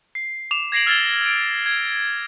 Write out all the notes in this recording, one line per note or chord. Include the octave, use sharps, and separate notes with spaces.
C7
D6 E7 F7
G#6 A#6 C7 D7 F#7
E6 F6 G#6 A6 F#7 G7
D7 F#7
G#6